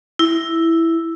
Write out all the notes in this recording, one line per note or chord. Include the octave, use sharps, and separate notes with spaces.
E4